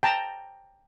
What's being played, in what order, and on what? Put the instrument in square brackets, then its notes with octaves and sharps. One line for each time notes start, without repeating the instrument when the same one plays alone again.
[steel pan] G5 A5 A#5